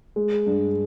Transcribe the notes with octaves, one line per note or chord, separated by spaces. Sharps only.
G#3
G2